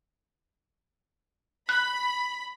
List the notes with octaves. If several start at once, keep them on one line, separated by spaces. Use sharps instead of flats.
B5 F#6